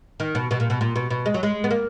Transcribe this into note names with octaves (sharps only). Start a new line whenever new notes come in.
D#3
B2
B2
A#2
B2
A#2
B2
B2
G#3
F#3
G#3
B3
A#3